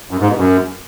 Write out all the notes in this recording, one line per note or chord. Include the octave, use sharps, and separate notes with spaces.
F#2
G#2
B2
F#2